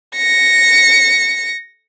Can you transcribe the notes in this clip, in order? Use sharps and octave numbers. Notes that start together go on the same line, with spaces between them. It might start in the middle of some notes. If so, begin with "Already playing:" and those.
A#6 C#7